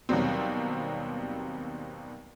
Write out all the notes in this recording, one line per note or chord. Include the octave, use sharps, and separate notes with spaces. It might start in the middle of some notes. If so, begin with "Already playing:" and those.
D#2 B2 F#3 G3 C4